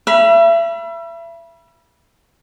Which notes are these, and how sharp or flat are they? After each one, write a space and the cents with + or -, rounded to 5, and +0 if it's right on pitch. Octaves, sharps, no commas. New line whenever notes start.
E5 +35 B5 -25